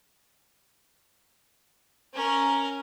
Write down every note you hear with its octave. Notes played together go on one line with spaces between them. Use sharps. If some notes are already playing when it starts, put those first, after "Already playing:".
C#4 A#4